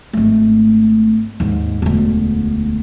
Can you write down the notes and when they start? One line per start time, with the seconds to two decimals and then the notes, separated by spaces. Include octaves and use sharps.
0.13 G#1 A3
1.40 D#2 G#2
1.82 E1 D2